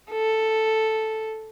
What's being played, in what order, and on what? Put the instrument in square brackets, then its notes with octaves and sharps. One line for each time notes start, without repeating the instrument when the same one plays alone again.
[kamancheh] A4